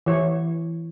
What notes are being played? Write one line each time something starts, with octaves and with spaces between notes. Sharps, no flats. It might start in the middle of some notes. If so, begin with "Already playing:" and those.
E3 C#5